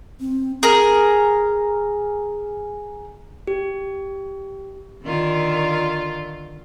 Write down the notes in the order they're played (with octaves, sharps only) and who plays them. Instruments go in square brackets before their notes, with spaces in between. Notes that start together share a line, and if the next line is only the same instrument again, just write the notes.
[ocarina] C4
[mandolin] G#4 A#4
[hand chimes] G4
[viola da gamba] D3 D#3 F4